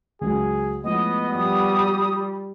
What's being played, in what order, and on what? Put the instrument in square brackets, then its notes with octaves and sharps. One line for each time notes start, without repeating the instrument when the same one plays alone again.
[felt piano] C#2 F#3 [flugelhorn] G#4
[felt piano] A2 F3 G#3 [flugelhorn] B3 [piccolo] D#5
[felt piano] F3 [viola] G3 [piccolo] D#6